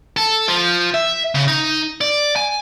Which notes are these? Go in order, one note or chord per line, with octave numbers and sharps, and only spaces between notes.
A4
F3
E5
C#3
D#4
D5
G#5